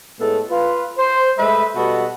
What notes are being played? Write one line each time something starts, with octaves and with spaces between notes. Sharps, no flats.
A2 G#3 A3 B3 A4
F4 B4
C5
G#3 A3 B4 D#5 E5
B2 G3 B3 F#4 A4 D#5